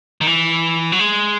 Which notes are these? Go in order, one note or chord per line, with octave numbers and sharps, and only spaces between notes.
D#3
E3
F#3
G#3